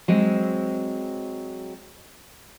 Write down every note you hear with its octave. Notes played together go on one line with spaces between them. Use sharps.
F#3 G#3 C4